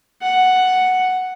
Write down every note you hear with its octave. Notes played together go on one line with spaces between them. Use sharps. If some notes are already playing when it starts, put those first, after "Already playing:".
F#5